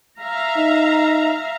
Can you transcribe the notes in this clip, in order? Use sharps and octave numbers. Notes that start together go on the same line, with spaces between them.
E5 F5 A#5
D#4